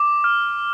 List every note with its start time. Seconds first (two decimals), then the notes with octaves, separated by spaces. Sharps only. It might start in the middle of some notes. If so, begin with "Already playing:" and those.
Already playing: D6
0.24 F6